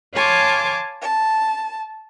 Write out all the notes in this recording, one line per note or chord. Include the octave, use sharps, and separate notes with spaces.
C#5 F5 G#5 A5 C6 D6
A5